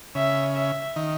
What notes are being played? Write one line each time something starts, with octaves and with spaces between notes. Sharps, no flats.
C#3 E5
E5
D#3